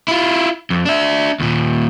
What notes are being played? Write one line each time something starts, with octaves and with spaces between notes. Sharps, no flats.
E4 F4
F2
D4 E5
D#2 A#2